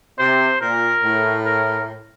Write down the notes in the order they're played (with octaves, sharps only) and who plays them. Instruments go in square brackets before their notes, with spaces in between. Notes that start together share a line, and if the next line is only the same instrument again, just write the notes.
[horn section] C3 [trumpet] C5
[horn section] A#2 [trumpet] A#4
[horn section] A2
[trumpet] A#4